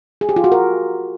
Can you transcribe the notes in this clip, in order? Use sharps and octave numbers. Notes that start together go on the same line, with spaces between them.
G#4
G4
F4
F#4
A#4